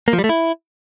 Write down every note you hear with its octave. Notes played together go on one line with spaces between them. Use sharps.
A#3
F3
G3
A3
E4